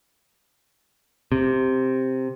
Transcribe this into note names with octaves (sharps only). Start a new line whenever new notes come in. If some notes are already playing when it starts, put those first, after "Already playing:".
C3